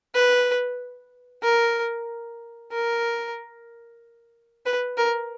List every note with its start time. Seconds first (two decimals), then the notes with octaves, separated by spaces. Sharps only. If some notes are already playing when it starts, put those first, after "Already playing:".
0.14 B4
1.43 A#4
2.72 A#4
4.66 B4
4.98 A#4